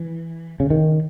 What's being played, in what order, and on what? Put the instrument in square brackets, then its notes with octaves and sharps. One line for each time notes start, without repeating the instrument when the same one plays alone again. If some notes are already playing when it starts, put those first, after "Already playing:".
Already playing: [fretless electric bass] E3
C#3
D#3